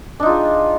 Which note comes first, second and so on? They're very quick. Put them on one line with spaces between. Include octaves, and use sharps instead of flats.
D4 D#4 F4 G#4